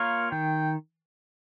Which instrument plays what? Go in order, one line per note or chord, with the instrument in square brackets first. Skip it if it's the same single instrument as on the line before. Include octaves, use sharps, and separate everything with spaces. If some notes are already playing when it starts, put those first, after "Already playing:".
Already playing: [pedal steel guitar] A#3 F4 A#4 C#5 [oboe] F5
[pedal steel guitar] D#3 [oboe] G5